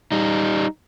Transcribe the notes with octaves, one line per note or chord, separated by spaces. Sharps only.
G3 D#4